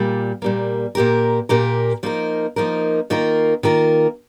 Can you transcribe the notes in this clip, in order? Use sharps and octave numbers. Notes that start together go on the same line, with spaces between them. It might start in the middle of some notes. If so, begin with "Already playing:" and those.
Already playing: A#2 G3 A#3
A#2 G3 A#3
A#2 A#3 G4 A#4
A#2 A#3 G4 A#4
F3 A#3 D#4 A#4
F3 A#3 D#4 A#4
D#3 A#3 F4 A#4
D#3 A#3 F4 A#4